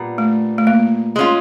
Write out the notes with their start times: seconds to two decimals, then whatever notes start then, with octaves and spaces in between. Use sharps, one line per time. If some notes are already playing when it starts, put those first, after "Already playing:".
Already playing: A#2 G3 B3 D4
0.18 A3
0.58 A3
0.67 A#3
1.16 G#3 C#4 F4